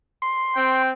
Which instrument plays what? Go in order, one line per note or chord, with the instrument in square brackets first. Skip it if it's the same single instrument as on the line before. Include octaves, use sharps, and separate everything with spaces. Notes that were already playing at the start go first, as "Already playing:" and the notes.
[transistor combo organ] C6
[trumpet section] C4 G5